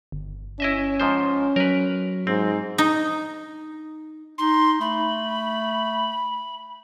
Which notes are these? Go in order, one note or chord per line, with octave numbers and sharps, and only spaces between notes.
G1
C#4 E4 D#5 E5
G#2 F3 C5
F#3 A#4 B4
G#2 C4
D#4
D#4 C6
A3 B5